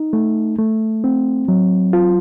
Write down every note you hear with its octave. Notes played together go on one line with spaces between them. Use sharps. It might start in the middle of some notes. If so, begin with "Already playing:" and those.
Already playing: D#4
A3
A3
C4
F#3
F4